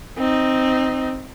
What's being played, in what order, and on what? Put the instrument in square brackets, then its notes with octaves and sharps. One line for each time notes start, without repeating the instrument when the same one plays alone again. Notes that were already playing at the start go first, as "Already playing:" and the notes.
[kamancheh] C4 D#4